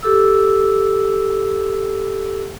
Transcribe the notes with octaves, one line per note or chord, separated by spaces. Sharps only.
G4 A4 D6 E6